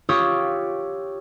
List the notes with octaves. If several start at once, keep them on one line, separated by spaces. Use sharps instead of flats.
F4 G4 C#5 C#6 D#6 E6